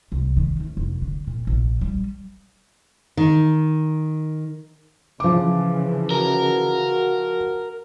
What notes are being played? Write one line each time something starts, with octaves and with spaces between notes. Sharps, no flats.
C2
D#3
D2
F1
D3
A#2
A#1
G3
D#3
C#3 E3 F3 D6
F#4 A#4